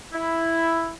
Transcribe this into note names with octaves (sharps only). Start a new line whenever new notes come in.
E4